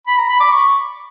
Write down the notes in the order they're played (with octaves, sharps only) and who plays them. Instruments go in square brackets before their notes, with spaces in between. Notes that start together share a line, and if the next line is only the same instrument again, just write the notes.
[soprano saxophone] B5
A#5
B5
D6
C#6